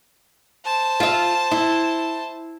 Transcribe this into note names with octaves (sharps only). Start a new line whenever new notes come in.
C5 A5
F4 E5
E4